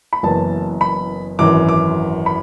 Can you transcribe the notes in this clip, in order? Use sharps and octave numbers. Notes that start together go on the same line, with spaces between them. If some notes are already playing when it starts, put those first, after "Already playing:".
B5
F#1 F#2 E3 B3 A5
B5
G#1 F#2 E3 D6
D6
B5